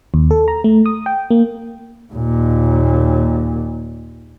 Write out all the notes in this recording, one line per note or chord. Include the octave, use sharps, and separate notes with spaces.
D#2
A4
A#5
A3
D#6
G5
A#3
D#2 A#2